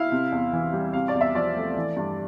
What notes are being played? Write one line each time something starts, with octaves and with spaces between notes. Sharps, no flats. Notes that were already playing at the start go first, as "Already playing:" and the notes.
Already playing: E4 F5
C3
E2
E3
G3
C3 F5
D5
E2
E5
F3 D5
A3
E3
G2